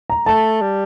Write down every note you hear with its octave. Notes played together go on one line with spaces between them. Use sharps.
A#5
A3 A5
G3